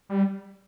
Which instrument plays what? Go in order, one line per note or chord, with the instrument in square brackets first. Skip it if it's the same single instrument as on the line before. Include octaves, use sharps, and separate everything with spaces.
[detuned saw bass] G3